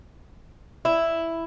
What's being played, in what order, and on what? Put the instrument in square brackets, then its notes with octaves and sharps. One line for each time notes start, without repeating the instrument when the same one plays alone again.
[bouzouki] E4